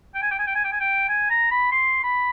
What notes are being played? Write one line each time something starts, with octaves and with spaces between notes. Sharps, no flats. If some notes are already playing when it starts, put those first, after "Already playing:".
G5
G#5
G5
G#5
G5
G#5
G5
G#5
G5
G#5
A#5
B5
C6
B5